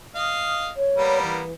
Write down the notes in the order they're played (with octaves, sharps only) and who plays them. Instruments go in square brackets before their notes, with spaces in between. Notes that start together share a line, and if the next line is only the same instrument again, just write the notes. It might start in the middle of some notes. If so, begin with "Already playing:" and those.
[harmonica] D#5 F5
[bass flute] C#5
[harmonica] G3 A#3 B3
[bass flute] E3